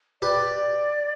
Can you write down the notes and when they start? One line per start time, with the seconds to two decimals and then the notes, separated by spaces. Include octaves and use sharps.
0.22 G4 B4 D5